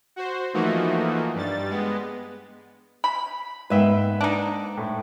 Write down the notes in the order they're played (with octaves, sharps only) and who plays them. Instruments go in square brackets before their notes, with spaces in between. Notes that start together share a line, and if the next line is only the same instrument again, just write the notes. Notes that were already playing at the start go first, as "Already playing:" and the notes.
[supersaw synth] F#4 C5
E3 F3 A3 A#3 D#4 F#4
G2 G3 A6
G#3 B3
[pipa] B5
[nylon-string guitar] G#2 A#3 B3 [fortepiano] B4 E5 G5
[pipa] D4 D#4
[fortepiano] A2